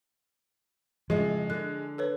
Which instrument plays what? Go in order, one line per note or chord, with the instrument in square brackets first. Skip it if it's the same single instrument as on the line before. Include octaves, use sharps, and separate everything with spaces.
[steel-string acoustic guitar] F2 A2 C#3 [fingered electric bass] F3 [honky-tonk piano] G#3
[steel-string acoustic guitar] D3 [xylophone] F#6
[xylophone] A4 B4 C#5